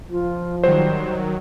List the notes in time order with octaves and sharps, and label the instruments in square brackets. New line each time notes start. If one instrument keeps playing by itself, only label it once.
[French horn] F3 [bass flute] F4
[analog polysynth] D#3 F#3 [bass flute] G3 [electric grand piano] C5